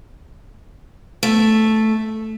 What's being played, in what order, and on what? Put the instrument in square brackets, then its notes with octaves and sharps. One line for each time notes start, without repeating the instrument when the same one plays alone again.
[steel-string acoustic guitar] A3